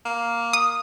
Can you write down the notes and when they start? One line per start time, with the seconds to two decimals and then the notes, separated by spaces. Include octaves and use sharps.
0.05 A#3
0.53 D#6